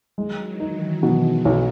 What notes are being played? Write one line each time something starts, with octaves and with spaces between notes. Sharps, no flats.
D#3 F#3 G#3
E3
D#4
D#3
B2 E3 G#3
B1